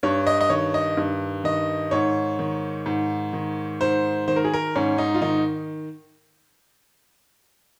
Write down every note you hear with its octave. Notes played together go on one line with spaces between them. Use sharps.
G2 C#5
D#5
D#5
D#3 C#5
D#5
G2
D#3 D#5
G#2 C#5
D#3
G#2
D#3
G#2 C5
D#3 C5
A#4
G#4
A#4
G#2 C#4
D#4
F4
D#3 D#4